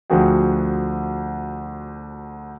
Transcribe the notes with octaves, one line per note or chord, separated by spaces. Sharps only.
D2 F3 F#4 G#4 G5